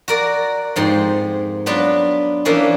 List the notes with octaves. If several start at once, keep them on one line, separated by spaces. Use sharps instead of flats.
F#4 A#4 D5
F2 G#2 C6
F#3 B3 D4 F4 B4
E3 F3 A#3 C#4 D4 E4